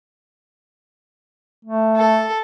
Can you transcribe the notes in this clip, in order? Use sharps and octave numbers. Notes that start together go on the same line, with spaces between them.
A3
A4